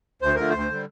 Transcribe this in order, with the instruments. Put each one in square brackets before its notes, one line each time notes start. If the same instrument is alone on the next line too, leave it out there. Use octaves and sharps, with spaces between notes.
[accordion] D2 C5
D3 F3 A3 A#4
D2 C5
D3 G3